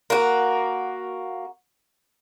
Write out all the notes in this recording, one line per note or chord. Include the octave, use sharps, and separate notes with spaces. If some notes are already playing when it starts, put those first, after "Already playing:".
A#3 F#4